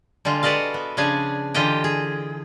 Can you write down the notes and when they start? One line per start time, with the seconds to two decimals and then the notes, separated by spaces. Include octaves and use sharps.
0.25 D3 G3 G#3 F4
0.43 F#4 A4 B4 D5 D#5 F5
0.74 B3
0.97 C#3 F3 D4 G#4 G#5
1.54 D3 E3 F4 G4 D#5 G5
1.84 G#4